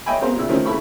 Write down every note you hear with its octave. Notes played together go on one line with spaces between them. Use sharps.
C#5 D#5 E5 G5 G#5 B5
B3 C4 G#4 A#4 C5 F5
A#2 C#3 E4 E6
D#3 F3 A3 C4 C#4
C#3 E4 A4 E5 B5 C#6